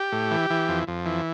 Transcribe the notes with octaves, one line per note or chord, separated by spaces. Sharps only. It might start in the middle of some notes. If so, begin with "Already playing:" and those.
Already playing: G4
A2
E3
E3
F2
F2
E3